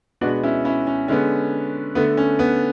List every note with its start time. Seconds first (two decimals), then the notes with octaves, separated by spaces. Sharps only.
0.21 B2 G#3 B3 D4 F#4
0.43 C#4 E4
0.65 C#4 E4
0.87 C#4
1.08 D3 G#3 B3 C#4
1.95 D3 A3 B3
2.17 C#4
2.39 B3